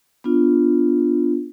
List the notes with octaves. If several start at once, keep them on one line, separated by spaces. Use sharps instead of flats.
B3 D4 F4